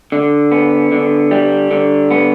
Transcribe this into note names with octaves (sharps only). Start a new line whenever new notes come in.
D3
B3
D3
G3
D3
B3